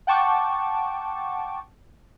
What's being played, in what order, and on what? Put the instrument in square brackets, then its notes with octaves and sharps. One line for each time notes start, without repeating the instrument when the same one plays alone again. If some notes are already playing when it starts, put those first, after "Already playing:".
[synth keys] F#5 G5 A5 C#6 D6